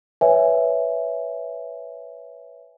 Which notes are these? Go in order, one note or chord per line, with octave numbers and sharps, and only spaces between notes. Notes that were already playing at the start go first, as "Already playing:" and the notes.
B4 C#5 E5 G#5